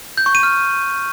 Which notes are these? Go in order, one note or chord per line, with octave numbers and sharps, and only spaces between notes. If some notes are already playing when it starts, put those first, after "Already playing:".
G6
C#6
D#7
F6